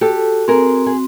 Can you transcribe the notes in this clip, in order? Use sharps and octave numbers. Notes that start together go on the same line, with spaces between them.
F#4 G4 A4
C4 G#4 A#4
G#4